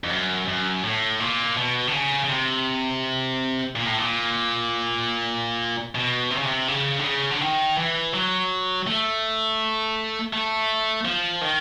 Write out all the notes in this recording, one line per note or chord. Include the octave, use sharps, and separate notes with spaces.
F2
F#2
F#2
A2
A#2
B2
D3
C#3
C#3
C3
A#2
A2
A#2
B2
C3
C#3
C3
C#3
D3
C#3
D3
D#3
E3
F#3
A3
A3
F3
D#3